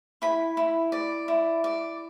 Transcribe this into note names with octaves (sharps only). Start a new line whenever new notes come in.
E4 B5
E4
D5
E4
D5